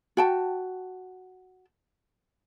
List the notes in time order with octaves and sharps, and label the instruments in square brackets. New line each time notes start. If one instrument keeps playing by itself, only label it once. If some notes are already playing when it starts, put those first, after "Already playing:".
[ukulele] F#4 G5 A5